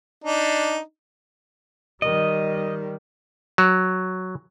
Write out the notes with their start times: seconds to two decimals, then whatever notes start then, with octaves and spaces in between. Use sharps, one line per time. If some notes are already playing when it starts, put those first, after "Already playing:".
0.24 D4 D#4
2.02 D#3 G3 D#5
3.58 F#3